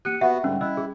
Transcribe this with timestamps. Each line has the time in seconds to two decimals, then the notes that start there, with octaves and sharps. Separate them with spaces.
0.05 A#3 G4 F#6 C#7 D#7
0.21 B3 F#4 E5 F#5
0.44 G#2 D3 G3 C#4
0.61 E4 D#5 E6 F#6
0.77 G#4